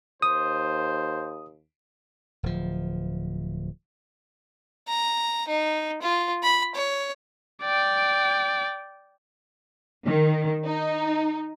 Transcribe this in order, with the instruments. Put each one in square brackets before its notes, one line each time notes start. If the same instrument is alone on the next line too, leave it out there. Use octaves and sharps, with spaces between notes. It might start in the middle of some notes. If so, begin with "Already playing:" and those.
[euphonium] D#2 [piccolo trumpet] C5 [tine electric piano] D#6
[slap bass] D1 F3
[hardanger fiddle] A#5
D#4
F4
B5
C#5
[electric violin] D5 G5
[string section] D#3
D#4